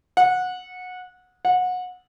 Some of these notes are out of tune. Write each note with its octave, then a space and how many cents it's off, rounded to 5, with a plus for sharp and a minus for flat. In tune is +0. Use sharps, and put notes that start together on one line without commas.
F#5 -20
F#5 -25